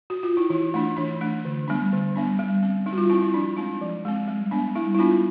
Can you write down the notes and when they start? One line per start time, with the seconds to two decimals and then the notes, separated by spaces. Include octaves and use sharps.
0.10 F#4
0.23 F4
0.37 E4
0.50 E3 D#4
0.74 A3 D4 D#4
0.97 E3 D4
1.21 A3 D4
1.45 D3
1.68 G3 B3 D4
1.92 D3
2.16 G3 B3 D4
2.39 G3
2.63 C4
2.86 G3 D#4
2.92 F#4
2.98 F4
3.05 D#4
3.10 C4 E4
3.22 D#4
3.34 F3 D4
3.57 G#3 C4 D#4
3.81 F3
4.05 G#3 C4
4.28 G3
4.51 B3 D4
4.75 G3 E4
4.94 E4
4.99 B3 D4 F4